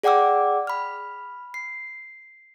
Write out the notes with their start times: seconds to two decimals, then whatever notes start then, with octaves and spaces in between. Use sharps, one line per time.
0.03 G#4 D5 F#5 G5 D6 E6
0.67 B5 F6
1.54 C7